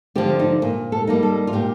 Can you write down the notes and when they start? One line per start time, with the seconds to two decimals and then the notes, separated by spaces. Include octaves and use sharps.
0.15 D3 F3 G4
0.39 D#4
0.62 A#2
0.92 A4
1.07 G3 A#3 D#4
1.23 A4
1.47 F4
1.53 A#2 G4